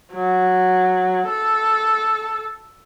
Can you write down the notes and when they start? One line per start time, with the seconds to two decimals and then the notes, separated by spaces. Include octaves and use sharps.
0.13 F#3
1.29 A4